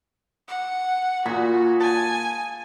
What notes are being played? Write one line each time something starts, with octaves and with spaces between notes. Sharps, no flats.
F#5
A#2 F#4 G#4 B5
G#5 A5